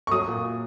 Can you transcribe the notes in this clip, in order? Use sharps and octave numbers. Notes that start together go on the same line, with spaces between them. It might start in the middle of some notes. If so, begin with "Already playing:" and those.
C#6
F#3 D#6
A#2